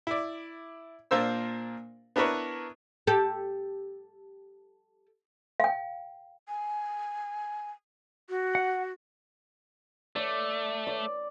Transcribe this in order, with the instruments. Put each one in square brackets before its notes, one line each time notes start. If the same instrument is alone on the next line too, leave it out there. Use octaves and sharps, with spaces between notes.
[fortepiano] E4 D5
A#2 D4 F4 A#4 C5 E6
B3 D4 E4 A#4 B4 C#5
[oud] G4 A4
[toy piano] F5 G5
[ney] G#5
F#4
[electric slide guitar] F#5
[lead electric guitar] A3 [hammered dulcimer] D5
[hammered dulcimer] D5